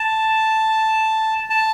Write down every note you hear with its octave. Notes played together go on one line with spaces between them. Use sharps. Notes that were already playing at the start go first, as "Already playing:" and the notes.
Already playing: A5
A5